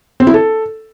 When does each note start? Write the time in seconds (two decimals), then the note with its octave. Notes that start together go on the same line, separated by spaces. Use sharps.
0.20 C4
0.27 E4
0.34 A4